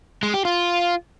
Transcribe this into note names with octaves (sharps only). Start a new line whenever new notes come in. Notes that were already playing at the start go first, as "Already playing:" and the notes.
G#3
G4
F4